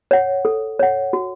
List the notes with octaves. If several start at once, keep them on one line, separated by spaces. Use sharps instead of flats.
C#5 F#5
A4
C#5 F#5
F#4